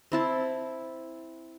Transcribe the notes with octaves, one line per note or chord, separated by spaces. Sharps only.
C4 E4 A5